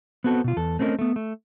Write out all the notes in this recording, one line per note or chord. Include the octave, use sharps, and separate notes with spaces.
B3 C4 F#4 A4
B2 F4
E2 A4
A3 C4 C#4 A4 A#4 D#5
A3 B3
A3